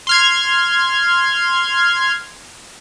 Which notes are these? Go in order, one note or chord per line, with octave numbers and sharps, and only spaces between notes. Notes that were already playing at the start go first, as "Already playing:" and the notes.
C6 F6 G#6